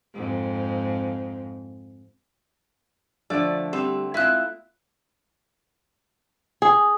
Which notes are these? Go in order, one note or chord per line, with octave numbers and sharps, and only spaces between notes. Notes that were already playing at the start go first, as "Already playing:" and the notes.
F2 G#2
D3 F3 A3 D5 E6
G3 B3 C4
G#3 C4 E4 F4 E5 F#6
G#4